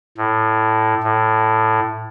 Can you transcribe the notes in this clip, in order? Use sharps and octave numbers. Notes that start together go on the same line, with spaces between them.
A2
A2